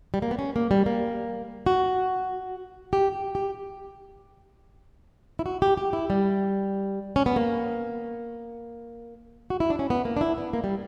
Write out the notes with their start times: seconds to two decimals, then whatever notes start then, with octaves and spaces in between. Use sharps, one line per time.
0.14 G3
0.22 A#3
0.31 B3
0.39 C#4
0.56 A#3
0.71 G3
0.86 A#3
1.66 F#4
2.93 G4
3.35 G4
5.39 E4
5.46 F#4
5.62 G4
5.77 G4
5.93 E4
6.10 G3
7.16 C#4
7.26 B3
7.36 A#3
9.50 F#4
9.60 E4
9.70 D4
9.79 C#4
9.90 B3
10.05 A#3
10.17 D4
10.21 E4
10.38 B3
10.53 A#3
10.64 G3